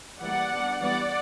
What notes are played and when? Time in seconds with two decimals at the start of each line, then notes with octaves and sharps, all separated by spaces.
0.21 E3 G3 A#3 D5 F#5
0.51 G3 B3 D4
0.81 E3 G3 B3 D5 F#5